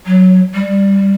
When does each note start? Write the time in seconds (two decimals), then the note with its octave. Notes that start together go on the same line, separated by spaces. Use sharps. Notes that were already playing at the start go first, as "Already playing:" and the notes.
0.06 F#3
0.54 G3